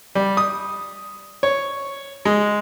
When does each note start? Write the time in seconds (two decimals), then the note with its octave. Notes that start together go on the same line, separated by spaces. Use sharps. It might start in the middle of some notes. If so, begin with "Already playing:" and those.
0.15 G3
0.37 D#6
1.43 C#5
2.25 G#3